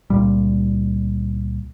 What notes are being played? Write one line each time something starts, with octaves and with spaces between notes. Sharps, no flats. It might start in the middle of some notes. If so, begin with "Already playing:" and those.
C#2 A#2 G3